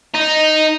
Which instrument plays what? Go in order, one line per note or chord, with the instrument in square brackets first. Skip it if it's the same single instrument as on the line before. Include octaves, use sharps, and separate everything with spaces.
[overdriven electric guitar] D#4